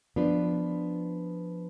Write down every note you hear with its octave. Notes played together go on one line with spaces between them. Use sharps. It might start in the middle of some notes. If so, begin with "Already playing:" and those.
F3 B3 D4 F4 B4